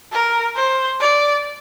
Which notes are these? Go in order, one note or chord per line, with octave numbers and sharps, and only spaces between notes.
A#4
C5
D5